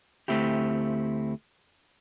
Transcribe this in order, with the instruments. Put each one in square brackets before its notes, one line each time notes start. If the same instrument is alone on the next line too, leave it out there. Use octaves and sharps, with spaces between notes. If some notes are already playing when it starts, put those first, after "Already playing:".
[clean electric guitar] D2 B2 A3 C4 E4 G4